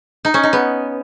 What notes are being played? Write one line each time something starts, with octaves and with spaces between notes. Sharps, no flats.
D#4
C#4
D#4
B3